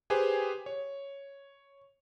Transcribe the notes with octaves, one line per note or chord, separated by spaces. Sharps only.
G4 G#4 B4 C5 G5 G#5
C#5